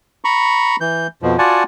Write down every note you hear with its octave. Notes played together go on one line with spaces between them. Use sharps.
A#5 B5 C#6
E3 G6
F2 B2 F3
F4 F#4 D5 F#5 G#5 A5